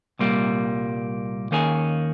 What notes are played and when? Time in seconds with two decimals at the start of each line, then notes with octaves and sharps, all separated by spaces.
0.19 C2 A#2 G3 A#3
1.51 D#2 D#3 A#3 C#4 G#4